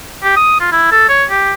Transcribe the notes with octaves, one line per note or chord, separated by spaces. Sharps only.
G4
D#6
F4
E4
A4
C#5
G4